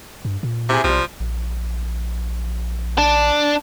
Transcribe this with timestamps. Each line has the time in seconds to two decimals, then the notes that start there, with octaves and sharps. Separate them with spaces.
0.25 G2
0.43 A#2
0.69 C3 E4 G#4
0.84 B1 C3 F3 G3
1.20 A#1
2.98 D4